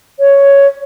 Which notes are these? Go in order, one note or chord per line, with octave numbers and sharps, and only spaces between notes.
C#5